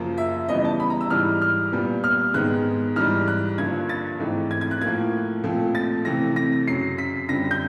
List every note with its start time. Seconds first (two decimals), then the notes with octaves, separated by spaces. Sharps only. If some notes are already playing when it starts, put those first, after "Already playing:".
Already playing: F#2 C#3 F3 A#3
0.18 E5
0.49 C#3 E3 G3 B3 D#5
0.64 A5
0.80 B5
0.90 A#5
1.01 E6
1.10 G#2 E3 G3 F6
1.42 F6
1.72 A#2 G3 B3
2.04 F6
2.34 G#2 D#3 G#3 B3 F#6
2.96 G#2 E3 G3 F6
3.28 F#6
3.58 G2 D3 F3 A#3 G#6
3.89 A6
4.20 G#2 E3 A3 C4
4.51 G#6
4.61 G#6
4.71 F#6
4.81 A2 F3 A#3 G#6
5.43 A#2 F3 A3 C4
5.75 A6
6.05 C3 E3 A3 C4 A#6
6.36 A#6
6.68 F#2 C#3 F#3 C7
6.98 B6
7.29 F#2 D3 G3 C4 A#6
7.51 G6